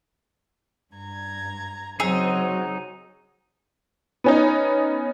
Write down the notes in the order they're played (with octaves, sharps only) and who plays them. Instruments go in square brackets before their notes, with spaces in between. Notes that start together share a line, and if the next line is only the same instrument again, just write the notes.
[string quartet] G2 A#5 G#6
[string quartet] C#3 C4 [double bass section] F#3 [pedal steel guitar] D#4 E6 [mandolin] G#4
[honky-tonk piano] B3 C#4 D#4